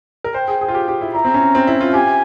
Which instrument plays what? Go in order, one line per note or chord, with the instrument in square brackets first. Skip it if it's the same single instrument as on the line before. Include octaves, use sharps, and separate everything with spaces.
[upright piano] A#4
[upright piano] C5 [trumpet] G5
[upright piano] G#4
G#4
F4
G4
G4
E4
[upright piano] E4 [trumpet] A#5
[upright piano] C4
C#4
C4
E4
F4
[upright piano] G4 [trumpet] G#5